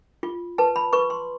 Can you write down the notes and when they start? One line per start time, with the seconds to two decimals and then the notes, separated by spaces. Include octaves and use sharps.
0.23 F4
0.58 B4 A5
0.76 B5
0.93 B4 C#6
1.10 C6